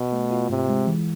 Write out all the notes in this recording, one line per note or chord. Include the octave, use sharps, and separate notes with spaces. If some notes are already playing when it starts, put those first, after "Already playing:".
Already playing: B2
A3
F4
G#2 C3
G#3
E3